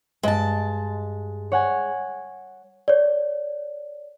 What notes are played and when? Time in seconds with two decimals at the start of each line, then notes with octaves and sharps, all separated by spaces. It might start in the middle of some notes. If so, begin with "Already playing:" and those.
0.23 G2 G#3 A5
1.52 C#5 F#5 G#5
2.88 C#5 D5